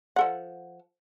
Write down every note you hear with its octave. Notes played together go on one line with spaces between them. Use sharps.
F3 A4 F#5